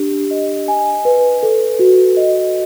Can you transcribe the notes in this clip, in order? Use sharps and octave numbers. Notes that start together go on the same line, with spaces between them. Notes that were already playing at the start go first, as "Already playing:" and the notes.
Already playing: D4 G4
D#5
G#5
B4
A4
F#4
D#5